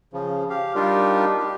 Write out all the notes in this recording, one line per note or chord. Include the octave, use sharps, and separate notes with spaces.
C#3 F3
G4 F5
G3 D4 D#4 F4 G4 A#4
G4